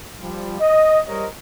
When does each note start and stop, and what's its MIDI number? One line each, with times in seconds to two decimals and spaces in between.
0.21 0.57 53
0.21 0.57 55
0.60 0.99 75
1.06 1.26 55
1.06 1.26 70
1.06 1.26 72
1.06 1.26 73
1.06 1.26 75